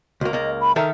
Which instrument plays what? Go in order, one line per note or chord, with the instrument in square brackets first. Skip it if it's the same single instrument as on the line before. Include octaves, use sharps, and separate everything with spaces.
[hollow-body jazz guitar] C#2 A#3 [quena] F#4
[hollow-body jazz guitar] C#2 A#3 [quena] D#5
[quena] B5
[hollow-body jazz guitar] D#3 A4 A#4 [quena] E5